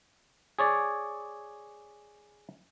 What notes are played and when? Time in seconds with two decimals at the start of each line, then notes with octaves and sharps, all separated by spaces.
0.59 G#4 C#5 D5